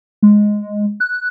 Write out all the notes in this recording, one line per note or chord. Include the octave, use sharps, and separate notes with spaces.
G#3
F#6